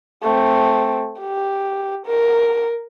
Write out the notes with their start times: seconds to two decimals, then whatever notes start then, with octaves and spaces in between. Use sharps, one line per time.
0.23 A3 C4
1.20 G4
2.06 A#4